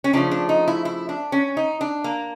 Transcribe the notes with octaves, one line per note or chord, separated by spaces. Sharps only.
C#4
C#3 F3 A3 D4
D4
D#4
E4
E4
D4
C#4
D#4
D4
A#3